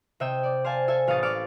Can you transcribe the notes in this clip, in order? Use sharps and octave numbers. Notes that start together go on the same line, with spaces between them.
C3 D#5 E5 G5 E7
D5
C5 F5 G#5 A5
A4 E5 G#5
A1 F5 C#6 D#6 A6
D5 F5 C#6 D6 E6 F6